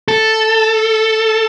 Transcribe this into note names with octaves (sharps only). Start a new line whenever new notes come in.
A4